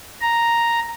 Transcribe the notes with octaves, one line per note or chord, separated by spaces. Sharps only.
A#5